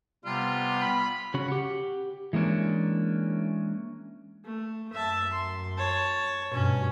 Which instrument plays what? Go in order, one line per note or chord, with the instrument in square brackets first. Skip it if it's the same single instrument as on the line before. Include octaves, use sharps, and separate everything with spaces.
[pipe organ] C3 G3 [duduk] B3 [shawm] F4
[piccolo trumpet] B5
[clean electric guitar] C#3 C#4 F#4 B5
G4 F#5
E3 G#3 A#3 C#4 D4
[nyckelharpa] A3
[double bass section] F#2 [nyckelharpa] E5 A5
[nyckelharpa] C6
C#5 A5
[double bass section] G2 B2 [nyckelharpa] C#4